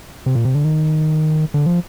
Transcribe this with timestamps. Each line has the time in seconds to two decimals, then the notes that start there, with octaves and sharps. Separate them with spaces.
0.26 C3
0.35 A#2
0.45 C3
0.55 D3
0.64 D#3
1.54 D3
1.66 F3